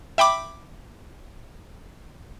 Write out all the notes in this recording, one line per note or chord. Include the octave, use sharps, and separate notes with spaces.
E5 G5 B5 D6